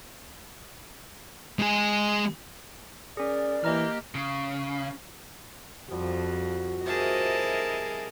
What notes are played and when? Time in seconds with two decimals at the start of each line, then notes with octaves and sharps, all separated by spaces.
1.59 G#3 G#4
3.17 C#4 G#4 A#4 D5
3.64 E3 A#3 G4 D#5 A#5 F6
4.15 C#3
5.90 F2 F3 G3 F#4
6.86 C3 E4 G#4 A#4 D#5 F5 A5